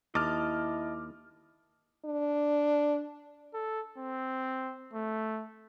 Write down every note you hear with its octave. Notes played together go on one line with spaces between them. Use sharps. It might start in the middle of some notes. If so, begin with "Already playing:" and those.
D#2 E4 D#5 A5 D6 F6
D4
A4
C4
A3